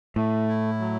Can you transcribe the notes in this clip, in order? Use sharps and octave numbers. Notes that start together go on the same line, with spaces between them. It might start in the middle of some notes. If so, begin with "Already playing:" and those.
A2 A3
E4
F#3